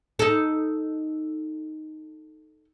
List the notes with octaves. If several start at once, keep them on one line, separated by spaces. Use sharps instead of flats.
D#4 A4